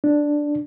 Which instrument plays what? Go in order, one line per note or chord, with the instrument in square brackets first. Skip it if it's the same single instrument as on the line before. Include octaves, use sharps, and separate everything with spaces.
[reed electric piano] D4